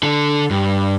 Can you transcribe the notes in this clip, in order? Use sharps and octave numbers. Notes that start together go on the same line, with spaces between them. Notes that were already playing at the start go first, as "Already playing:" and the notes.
D3 A4
G2